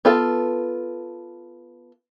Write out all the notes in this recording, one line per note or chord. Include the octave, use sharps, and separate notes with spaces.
B3 F4 A4